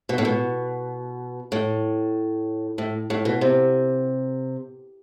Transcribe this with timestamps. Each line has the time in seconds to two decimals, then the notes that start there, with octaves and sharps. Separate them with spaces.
0.09 B2
0.18 A2
0.25 B2
1.52 A2
2.78 A2
3.10 A2
3.25 B2
3.41 C3